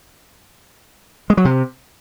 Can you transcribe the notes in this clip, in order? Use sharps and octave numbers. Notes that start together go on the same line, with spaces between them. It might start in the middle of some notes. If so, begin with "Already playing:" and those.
G#3
F#3
C3